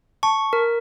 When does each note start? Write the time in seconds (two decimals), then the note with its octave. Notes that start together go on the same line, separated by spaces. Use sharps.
0.23 A5 C#6
0.53 A#4